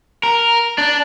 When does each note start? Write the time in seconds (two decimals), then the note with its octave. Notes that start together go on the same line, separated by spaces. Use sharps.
0.23 A#4
0.78 D4